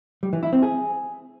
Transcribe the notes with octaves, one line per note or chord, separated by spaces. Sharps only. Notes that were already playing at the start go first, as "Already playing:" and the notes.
G3
E3
E4
C4
G#4